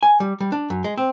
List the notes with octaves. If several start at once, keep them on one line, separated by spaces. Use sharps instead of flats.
G#5
G3
G3
D4
F#2
G#3
C4